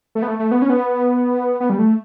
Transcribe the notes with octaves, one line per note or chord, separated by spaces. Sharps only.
A3
B3
A3
A3
B3
C#4
B3
B3
G3
A3